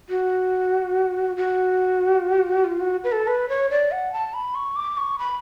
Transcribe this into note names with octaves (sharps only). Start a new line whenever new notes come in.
F#4
F#4
F4
F#4
B4
A4
B4
C#5
D5
F#5
A5
B5
C#6
D6
C#6
B5